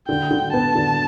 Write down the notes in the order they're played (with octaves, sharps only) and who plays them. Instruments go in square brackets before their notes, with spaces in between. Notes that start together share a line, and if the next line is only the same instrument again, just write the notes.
[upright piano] D3 [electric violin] G5
[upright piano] D3
[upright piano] B3 [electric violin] A5
[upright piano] D3